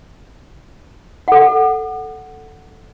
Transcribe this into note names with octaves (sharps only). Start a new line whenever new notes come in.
A4 F#5